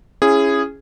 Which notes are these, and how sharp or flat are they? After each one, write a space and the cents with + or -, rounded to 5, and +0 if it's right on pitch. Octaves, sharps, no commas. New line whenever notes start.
C#4 +0 E4 +30 G#4 -10